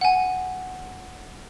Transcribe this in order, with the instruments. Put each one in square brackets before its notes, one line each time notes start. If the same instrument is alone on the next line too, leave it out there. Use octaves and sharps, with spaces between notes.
[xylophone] F#5 G#5